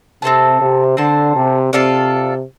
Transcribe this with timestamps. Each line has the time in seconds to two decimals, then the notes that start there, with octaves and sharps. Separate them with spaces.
0.22 C3 C4 A4 C5 A5
0.61 C3
0.97 D3 C4 A4 C5 A5
1.36 C3
1.73 C3 F4 A4 D5 F5